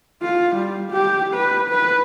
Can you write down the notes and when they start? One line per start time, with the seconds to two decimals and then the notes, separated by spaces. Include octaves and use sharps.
0.22 F4
0.56 G3
0.92 G4
1.34 B4
1.70 B4